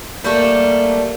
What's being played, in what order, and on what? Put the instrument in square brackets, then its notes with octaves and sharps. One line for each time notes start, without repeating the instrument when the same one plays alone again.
[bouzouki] G3 A3 D4 [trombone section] A#3